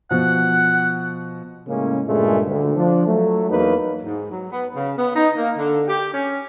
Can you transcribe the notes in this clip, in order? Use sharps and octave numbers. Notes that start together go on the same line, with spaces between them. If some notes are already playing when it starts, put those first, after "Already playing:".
B2 F3 F#5
A2 C#3 G#3 A#3 C#4
G2 A#2 C#3 G#3 A3
D2
F3 D4
F#3 A3
E2 F#3 A#3 D#4 B4
G#2
F#3
B3
C#3
B3
D#4
A#3
D3
G4
C#4